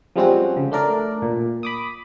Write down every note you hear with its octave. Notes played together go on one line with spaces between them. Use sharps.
F3 G3 G#3 C4 C#4 F#4
C#3
A3 D4 A#4 D5
A#2
B5 D6 D#6